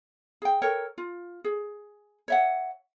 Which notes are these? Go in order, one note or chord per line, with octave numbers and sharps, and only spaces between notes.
G#4 G5
A4 A#4 C#5 G5
F4
G#4
C#5 E5 F#5